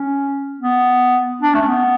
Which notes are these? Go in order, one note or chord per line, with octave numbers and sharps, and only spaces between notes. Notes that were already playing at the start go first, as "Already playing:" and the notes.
Already playing: C#4
B3
D4
A3
C#4
B3